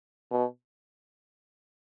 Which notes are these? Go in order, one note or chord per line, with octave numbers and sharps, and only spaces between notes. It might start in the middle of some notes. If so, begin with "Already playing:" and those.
B2